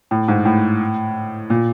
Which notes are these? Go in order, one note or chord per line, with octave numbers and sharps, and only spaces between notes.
A2
G#2
A2
A#2